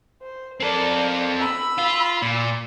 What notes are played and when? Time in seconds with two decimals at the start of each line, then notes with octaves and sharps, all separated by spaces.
0.22 C5
0.60 C4 A4 A#4 D5
1.39 B5 E6
1.78 F4
2.22 A#2